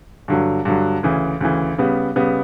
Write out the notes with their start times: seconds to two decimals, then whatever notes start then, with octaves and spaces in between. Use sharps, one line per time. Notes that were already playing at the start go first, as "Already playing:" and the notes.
0.28 G2 D3 F#3
0.65 G2 D3 F#3
1.03 D2 C#3 E3
1.41 D2 C#3 E3
1.78 C#3 G3 B3
2.16 C#3 G3 B3